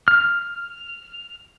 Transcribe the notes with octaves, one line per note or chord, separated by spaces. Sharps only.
F6